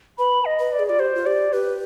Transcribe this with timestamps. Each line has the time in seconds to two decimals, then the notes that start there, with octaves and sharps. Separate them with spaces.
0.19 B4 B5
0.45 D#5
0.59 B4
0.72 D5
0.79 G#4
0.88 F4 D5
0.99 G4 C5
1.15 F4
1.26 G4 D5
1.53 G4 B4